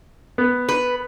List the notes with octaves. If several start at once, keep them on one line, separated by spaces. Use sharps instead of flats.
B3
B4